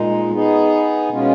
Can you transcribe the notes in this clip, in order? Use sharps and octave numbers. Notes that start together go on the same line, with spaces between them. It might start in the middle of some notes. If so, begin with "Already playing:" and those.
Already playing: A#2 G#3 D#4
B3 D#4 G#4
B2 G#3 C#4 F4